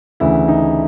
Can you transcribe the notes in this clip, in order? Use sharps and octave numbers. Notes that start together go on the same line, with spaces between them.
D2 C#3 E3 E4
D#4